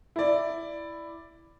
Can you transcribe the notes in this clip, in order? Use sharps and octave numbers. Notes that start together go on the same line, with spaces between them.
E4 D5